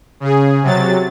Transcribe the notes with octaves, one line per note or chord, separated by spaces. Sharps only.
C#3 G#4
C3 F#3 A6